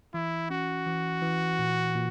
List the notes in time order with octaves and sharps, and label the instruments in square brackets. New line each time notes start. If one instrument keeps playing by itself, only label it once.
[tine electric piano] E3 [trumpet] E4
[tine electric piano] C#4 [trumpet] F#4
[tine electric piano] E3
E3
A#2
A#2